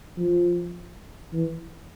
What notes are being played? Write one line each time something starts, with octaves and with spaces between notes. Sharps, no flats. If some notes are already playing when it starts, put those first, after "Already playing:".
F3
E3